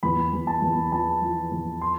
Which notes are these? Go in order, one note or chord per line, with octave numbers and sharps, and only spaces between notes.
E2 B5
E2
A5
E2
F3 A5
F3
E2
C6